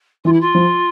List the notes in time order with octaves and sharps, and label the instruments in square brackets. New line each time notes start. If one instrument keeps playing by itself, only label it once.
[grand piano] E3 [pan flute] F4
[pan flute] E4
F4
[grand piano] F3